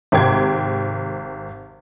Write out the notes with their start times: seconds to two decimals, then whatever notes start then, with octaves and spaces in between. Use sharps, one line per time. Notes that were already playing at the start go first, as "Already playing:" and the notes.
0.12 G#1 C3 G5 G#6